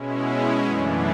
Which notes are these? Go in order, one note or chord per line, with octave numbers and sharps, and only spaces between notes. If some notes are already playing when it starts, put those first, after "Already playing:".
Already playing: B2 G#3 C#4 E4
F#2 C#3 E3 A3 D4